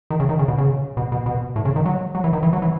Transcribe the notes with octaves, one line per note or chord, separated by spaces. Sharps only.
D#3
C#3
D#3
C#3
B2
C#3
B2
B2
B2
A2
C#3
D#3
F#3
F#3
E3
D#3
E3
F#3
E3